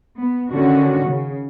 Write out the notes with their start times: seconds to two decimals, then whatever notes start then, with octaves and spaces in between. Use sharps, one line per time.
0.17 B3
0.52 D3 D#3 C#4 F#4
1.07 C#3